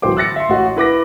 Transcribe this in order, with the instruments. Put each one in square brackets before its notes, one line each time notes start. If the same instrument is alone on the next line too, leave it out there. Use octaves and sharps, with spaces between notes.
[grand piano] D1 E3 F#3 C5 G5 D6
E6 F#6 A6 A#6 C#7
E5 C6
A1 F#4 D#5
E4 B4 D6 A#6